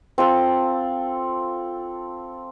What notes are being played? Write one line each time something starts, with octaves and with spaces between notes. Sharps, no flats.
C4 F4 A4